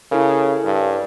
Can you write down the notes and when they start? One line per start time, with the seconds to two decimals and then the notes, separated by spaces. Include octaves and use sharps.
0.12 C#3 E4 A4 A#4
0.65 G2